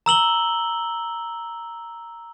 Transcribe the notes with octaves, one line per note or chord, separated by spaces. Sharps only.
A#5 E6 F#7 G7